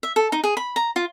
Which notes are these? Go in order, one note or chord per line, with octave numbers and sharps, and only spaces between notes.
E5
A4
D#4
G#4
B5
A#5
F4